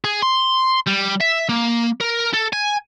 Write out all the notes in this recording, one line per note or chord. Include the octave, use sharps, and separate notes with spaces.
G#4
C6
G3
E5
A#3
A#4
A4
G#5